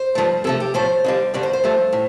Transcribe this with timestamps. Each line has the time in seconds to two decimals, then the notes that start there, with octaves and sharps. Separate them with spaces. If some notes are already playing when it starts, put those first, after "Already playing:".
Already playing: C5
0.15 G2 F3 A3
0.44 C3 F3 A3 A4
0.60 G4
0.74 A2 F3 A3 C5
1.04 F2 D3 G3
1.34 G2 D3 G3 D5
1.43 C5
1.53 C5
1.64 G2 F3 A3
1.93 A2